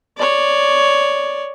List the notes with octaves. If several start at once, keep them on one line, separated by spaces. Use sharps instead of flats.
C#5 D5